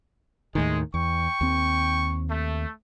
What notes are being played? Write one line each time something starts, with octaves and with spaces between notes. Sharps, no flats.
D#2 A2 D#3 G#3
E2 G5 C#6
D#2 C4
A3